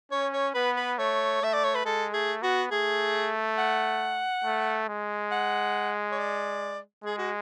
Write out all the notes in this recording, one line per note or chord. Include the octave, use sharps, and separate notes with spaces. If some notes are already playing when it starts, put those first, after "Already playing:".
C#4 C#5
C#5
B3 B4
B4
A3 C#5
A3 E5
D5
C#5
B4
G#3 A4
A3 G#4
B3 F#4
A3 G#4
F#5
A3
G#3
F#5
C#5
D5
G#3 G#4
F#4